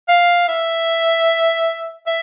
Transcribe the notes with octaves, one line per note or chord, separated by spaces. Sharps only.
F5
E5
E5